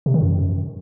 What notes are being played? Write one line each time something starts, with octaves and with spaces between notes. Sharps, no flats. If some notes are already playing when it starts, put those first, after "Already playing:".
C3
D#3
F#2